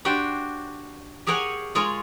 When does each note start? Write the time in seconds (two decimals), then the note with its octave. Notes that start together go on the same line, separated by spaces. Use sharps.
0.05 D4 F#4 G4 C5 G5
1.27 G4 G#4 A#4 C#5 F#5 G#5
1.75 G#3 F4 G#4 A#4 C#5